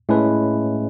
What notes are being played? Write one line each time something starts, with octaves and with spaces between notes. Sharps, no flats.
A2 G#3 C#4 E4 B4